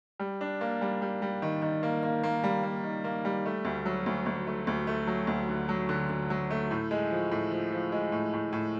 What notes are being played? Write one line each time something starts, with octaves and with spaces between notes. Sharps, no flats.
G3
D4
A#3
G3
G3
G3
D#3
D#3
A#3
A#3
A#3
G3
A#3
D#3
A#3
G3
A3
D2
F#3
D2
D2
A3
D2
A3
F#3
D2
D3
F#3
D3
D3
F#3
A3
A2
G#3
F3
A2
F3
F3
G#3
A2
A2
A2